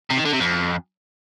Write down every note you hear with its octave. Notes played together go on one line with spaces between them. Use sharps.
C3
D#3
D3
C3
F2